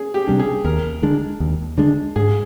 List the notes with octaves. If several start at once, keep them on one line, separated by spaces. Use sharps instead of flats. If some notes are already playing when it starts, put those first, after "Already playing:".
Already playing: G#4
G4
C3 G3 D4
G#4
D#2 A#4
D3 G#3 D4
D#2
D3 G#3 D4
G#2 G#4